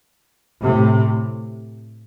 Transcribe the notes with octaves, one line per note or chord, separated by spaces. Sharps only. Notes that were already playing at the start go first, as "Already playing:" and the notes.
A2 C3